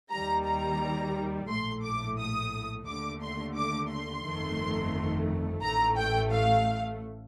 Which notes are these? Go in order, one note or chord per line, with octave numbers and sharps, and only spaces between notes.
D#2 D#3 G3 A#5
A#5
A#1 A2 A3 C6
D6
D#6
D#2 D3 A3 D6
C6
D6
C6
G1 F2 D#3 A3
A1 A2 A3 A#5
G5
F5